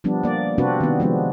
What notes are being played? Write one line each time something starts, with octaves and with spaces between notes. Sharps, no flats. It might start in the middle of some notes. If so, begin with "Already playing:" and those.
F3 G3 B3 D4
A#3 D5
C3 C4 D4 F#4 B4
D#3 B3
F3 G#3 B3 D4